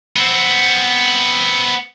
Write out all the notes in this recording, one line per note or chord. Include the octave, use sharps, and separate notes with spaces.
B3 C4